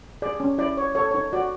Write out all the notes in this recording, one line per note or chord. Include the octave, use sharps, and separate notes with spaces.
G#4 D5
C#4
E4 D5
C#5
A4 C#5
D#4 C#5
F#4 D5